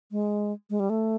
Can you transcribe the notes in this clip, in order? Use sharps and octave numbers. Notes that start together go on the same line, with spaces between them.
G#3
G#3
G3
A3